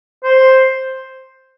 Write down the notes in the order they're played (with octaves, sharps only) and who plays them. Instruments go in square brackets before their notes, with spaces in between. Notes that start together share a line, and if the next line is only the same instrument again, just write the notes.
[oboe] C5